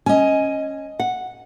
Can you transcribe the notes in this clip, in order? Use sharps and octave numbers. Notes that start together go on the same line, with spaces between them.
C#4 D#5 G#5
F#5